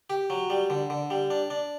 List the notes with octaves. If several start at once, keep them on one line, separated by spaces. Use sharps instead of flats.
G4
F#3
G3
D3
D3
G3
D4
D4